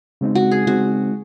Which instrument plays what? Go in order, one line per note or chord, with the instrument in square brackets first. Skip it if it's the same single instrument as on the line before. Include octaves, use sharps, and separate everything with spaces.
[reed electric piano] C#3 G#3 C4 D#4
[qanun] F#4
G#4
[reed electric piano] C#3 G#3 C4 D#4 [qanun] F#4